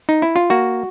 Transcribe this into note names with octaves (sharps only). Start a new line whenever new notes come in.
D#4
E4
F4
A#3 F#4